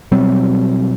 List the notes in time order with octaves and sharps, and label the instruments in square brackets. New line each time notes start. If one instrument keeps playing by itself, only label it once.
[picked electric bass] B2 F#3 G3 C4